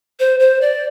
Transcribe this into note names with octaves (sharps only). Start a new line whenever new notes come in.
C5
C5
D5